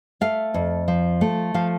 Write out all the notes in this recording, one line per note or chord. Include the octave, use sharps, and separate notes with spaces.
A3 F5
F2
F3
A3
F3 F5